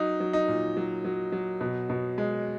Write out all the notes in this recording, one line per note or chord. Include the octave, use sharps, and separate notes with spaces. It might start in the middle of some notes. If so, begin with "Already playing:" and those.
Already playing: F#3 D#4
F#3
D#4
A#2
F#3
F#3
F#3
B2
B2
G#3